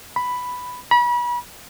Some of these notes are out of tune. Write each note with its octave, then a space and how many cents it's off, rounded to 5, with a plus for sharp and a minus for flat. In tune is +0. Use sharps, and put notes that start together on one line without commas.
B5 +5
B5 -35